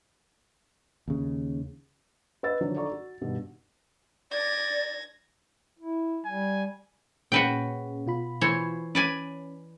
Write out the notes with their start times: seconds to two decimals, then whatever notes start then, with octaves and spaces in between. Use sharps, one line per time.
1.08 D#2 C#3
2.43 B4 D#5 E6 A6
2.60 D3 D#3 F3 F#3 D4
2.75 D#4 A4 D5 A#5 C#6
2.91 F#4
3.21 G2 B2 D#3
4.31 D5 G#6 A#6
5.79 E4
6.26 G3 G#5
7.32 A#2 C#4 F#4 G#4 B4 G5
8.06 B2 F4 B5
8.41 E3 C5 C#5
8.95 C#4 B4 D5 G#5